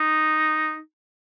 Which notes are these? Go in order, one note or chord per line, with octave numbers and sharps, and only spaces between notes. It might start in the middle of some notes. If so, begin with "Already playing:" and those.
Already playing: D#4